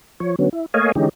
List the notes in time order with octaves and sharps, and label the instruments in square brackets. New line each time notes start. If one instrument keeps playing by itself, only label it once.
[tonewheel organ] F3 C#5
D3 F#3 B3 C#4
E4
A3 A#3 C#5 D#5 F5 G#5
D3 E3 G#3 C#4 D#4 G4